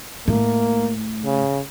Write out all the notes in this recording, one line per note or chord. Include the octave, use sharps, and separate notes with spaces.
A2 A#3
C#3